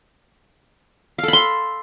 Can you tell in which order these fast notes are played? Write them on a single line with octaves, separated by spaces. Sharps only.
F5 A4 B5 C6